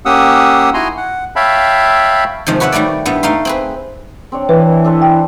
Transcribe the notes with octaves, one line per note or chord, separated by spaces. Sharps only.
A#3 C#4 G4 F#5 D#6 E6
D#4 E4 F#4 G#5 A#5 C6
F#5
C#5 E5 F5 G5 A5 B5
C3 D#3 F3 G#3
F#4 B4 C#5 E5 F#5
D#3 G3 A3 C#5 D5
G2 G3 B3 E4
A3 D#4 F5 C6
C4 G#4 B4
C4 D4 C#5
E3 B4
D4 A4 C5
G5